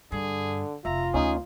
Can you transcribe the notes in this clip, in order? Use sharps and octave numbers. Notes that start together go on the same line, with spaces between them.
G2 D3 G#4
F1 F4 E5 A#5
D2 C#4 D#4 G#4